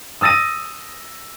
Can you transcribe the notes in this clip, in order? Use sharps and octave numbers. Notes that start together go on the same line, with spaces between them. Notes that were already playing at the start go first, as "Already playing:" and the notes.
D#6 E6 A6 A#6 D#7